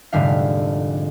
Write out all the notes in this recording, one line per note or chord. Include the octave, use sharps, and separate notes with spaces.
F1 G#2 D3 G3 E5 F5